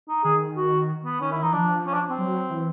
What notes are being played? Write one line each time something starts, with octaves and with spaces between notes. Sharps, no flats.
D#4
D#3 G#4
F#4
B3
D#3 C#4
E4
E3 D#4
F3 D4
C#4
D4
C4
F#3
E3